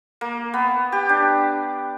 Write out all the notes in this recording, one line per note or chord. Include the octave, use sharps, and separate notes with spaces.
A#3
B3
G4
D4